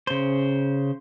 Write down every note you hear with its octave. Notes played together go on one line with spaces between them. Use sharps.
C#3 C5